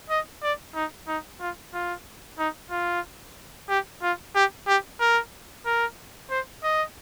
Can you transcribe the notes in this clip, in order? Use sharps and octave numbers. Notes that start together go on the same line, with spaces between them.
D#5
D5
D#4
D#4
F4
F4
D#4
F4
G4
F4
G4
G4
A#4
A#4
C5
D#5